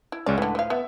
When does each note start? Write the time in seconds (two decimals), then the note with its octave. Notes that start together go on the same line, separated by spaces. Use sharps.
0.12 E4
0.26 C#2 G#3 C#4 D5
0.38 A2 D3 E3 B4
0.55 F3 F5
0.70 B3 E5